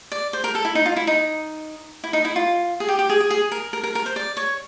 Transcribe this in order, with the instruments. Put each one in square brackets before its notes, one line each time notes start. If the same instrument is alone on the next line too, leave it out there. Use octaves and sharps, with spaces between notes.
[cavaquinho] D5
C5
A#4
A4
E4
D#4
F4
E4
D#4
E4
D#4
E4
F4
G#4
G4
G4
G#4
G#4
G#4
A#4
A#4
A#4
A#4
C5
D5
C#5